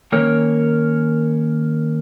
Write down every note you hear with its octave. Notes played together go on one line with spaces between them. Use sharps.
D#3 A#3 C#4 A#4 C#5